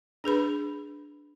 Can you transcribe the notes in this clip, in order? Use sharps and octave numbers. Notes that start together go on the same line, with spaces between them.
D4 G#4 B4 B5